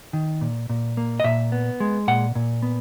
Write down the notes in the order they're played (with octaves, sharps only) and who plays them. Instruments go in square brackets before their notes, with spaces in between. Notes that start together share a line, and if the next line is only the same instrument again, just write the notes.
[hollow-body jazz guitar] D#3
A#2
A#2
A#3
D#5
A#2 E5
B3
G#3
A#2 F#5
A#2
B3